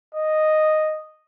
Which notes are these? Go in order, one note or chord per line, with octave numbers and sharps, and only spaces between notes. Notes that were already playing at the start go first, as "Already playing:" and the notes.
D#5